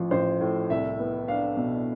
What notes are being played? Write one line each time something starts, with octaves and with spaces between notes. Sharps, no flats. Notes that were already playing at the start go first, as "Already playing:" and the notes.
Already playing: A1 F3
A1 C5
A2
C2 E5
B3
D4 F5
B2